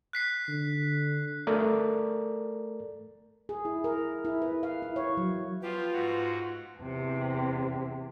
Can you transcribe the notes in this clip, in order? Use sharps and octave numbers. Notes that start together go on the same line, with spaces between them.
F#6 B6 C7
D3
A3 A4 A#4 D5
G#4
E4
A#4
E4
B4
F5
E4
C#5
F#3
F3 B3 F4 G4
G#2 F#4
E2 C3